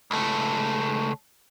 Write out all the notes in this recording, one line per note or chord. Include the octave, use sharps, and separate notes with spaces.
C#2 A3